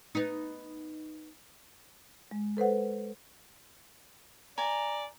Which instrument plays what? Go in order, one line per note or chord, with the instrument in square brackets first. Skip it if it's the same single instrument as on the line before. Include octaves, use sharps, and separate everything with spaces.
[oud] B3 D#4
[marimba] G#3
A4 B4 C5 F#5
[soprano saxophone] D5 [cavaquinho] G#5 [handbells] A#5